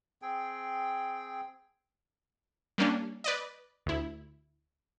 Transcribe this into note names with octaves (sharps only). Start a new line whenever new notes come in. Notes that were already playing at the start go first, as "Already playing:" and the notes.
C4 G#4 G5
G3 A#3 C#4 D4
B4 D5 D#5
D2 E4